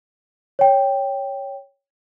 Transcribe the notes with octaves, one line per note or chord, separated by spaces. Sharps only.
C#5 G5